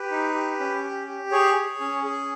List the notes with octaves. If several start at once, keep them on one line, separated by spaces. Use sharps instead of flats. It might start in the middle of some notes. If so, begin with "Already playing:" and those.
Already playing: G4 B4
D#4
G4
C#4
G4
G4
G#4 C#5
G#4
C#4
G#4